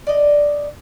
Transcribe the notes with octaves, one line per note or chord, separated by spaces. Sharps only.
D5 D#5